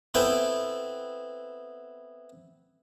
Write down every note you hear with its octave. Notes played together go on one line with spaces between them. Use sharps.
B3 C4 E4 A4 G5 G#5